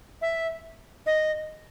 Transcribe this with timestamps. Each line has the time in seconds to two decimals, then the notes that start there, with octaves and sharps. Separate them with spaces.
0.22 E5
1.06 D#5